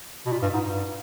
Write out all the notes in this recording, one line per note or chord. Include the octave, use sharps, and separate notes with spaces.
B2
A#2
G2
G#2
G2